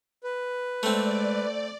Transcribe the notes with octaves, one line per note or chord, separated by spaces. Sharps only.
B4
G#3 A3 C4 D5